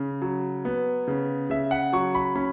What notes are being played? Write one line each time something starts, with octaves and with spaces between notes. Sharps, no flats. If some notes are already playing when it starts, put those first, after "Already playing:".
Already playing: C#3
F#3
B3
C#3
C#3 E5
F#5
F#3 C#6
B5
C#4 B5